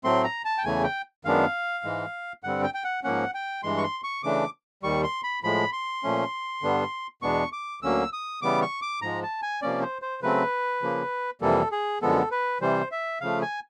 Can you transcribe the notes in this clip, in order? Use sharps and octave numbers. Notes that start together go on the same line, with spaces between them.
A2 F#3 A3 C4 C6
A#5
A5
G5
E2 C#3 E3 A3 G#5
G5
F#2 D#3 G#3 B3 D4 F5
G#2 E3 G#3
G2 D3 G3 C4 F#5
G5
G5
F#5
G#2 F3 A#3 C#4 F#5
G5
G2 E3 G#3 C6
C#6
C6
C#6
C#3 E3 A3 D4 D6
D#2 D#3 G3 C#6
C6
B5
A2 F3 G#3 B5
C6
A#2 F3 A3 C#4
G2 D3 G3 B3 D4
E2 B2 G#3 B3 D4 C#6
D6
D2 D3 F#3 A#3 C#4 E6
D#6
C#3 E3 G3 B3 D6
C#6
D6
G#2 F3 G#3 A#5
A5
G#5
C3 F3 A#3 C#4 D5
C5
C5
C#3 F#3 A3 C4 B4
C#3 F3 A#3
F2 C3 E3 G3 A#3 A4
G#4
F#2 D3 F3 G#3 B3 A4
B4
C3 E3 G3 C5
E5
C#3 F3 A3 F5
G#5